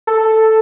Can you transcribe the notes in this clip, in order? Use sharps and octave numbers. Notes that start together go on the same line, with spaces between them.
A4